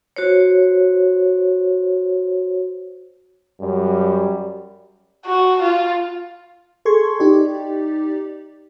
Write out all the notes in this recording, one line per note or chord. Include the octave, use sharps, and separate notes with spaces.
F#4 C5 C#5
F#2 G3
F#4
F4
G#4 A4 C6 C#6 G#6
D#4 G4 D5